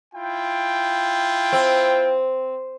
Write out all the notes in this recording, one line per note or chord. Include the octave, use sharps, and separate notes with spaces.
E4 F4 G5
C4